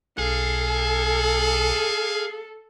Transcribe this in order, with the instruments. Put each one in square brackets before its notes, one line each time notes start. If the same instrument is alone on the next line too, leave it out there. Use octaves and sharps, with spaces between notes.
[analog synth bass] B1 [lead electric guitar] G#4 [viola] A4 [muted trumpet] F5